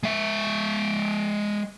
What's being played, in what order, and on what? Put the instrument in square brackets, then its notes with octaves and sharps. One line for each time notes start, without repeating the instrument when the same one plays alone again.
[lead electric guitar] G#3 E5